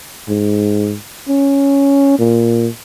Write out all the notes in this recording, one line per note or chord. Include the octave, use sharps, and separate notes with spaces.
G#2
C#4
A#2